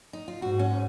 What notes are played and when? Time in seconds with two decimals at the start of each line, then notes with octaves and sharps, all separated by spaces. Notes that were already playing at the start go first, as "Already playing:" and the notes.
0.13 D#4
0.28 F4
0.41 G#2 F#4
0.59 C#4